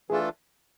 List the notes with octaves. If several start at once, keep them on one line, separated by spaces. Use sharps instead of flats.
E3 A3 D4 F4 G#4 A4